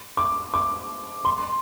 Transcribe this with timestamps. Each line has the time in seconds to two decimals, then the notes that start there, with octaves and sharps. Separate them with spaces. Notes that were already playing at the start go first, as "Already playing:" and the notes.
0.17 D6
0.54 D6
1.25 C6